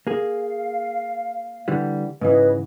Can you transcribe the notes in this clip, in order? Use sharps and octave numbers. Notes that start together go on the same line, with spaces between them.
A#3 G#4 F5
D3 E3 G3
G#2 C#3 E3 B4 C#5 D#5